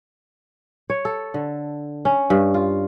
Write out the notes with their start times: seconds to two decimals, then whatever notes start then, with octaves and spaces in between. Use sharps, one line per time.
0.90 C#5
1.05 A4
1.34 D3
2.05 C#4
2.30 G2
2.54 F4